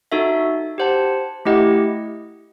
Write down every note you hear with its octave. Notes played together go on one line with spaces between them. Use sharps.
D#4 F#4 A4 E5
G4 C5 F#5 A5
A3 E4 G4 D#5 F#5